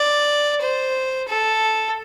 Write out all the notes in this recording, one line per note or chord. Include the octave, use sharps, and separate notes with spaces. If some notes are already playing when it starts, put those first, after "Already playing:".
Already playing: D5
C5
A4